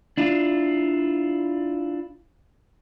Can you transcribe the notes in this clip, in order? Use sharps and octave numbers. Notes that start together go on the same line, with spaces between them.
D4 E4 F4